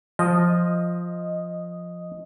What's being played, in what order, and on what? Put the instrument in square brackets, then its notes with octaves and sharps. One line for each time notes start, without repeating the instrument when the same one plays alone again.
[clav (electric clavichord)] F3 [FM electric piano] D#5